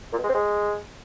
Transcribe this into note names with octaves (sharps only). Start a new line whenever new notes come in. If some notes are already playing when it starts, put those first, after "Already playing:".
A#2
B2
G#3
C4
G#3